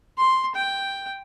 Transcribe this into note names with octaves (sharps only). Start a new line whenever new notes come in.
C6
G5